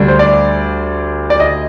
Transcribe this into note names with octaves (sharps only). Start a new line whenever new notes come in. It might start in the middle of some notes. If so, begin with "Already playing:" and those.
Already playing: D2 D3 G3 D4
C5
D5
D5
D#5